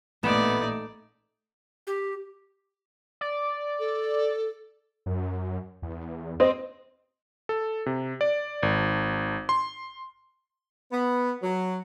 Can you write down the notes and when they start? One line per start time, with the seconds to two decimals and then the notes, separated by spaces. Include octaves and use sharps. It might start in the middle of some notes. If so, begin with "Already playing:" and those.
0.23 A1 A#2 A3 B3 D#4 D5 E7
1.87 G4
3.21 D5
3.80 A4
5.06 F#2
5.82 E2
6.40 C4 D#5
7.49 A4
7.86 C3
8.21 D5
8.63 G#1
9.49 C6
10.92 B3
11.42 F#3